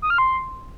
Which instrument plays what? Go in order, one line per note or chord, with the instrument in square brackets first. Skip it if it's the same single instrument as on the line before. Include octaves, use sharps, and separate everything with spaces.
[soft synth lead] D#6
F6
C6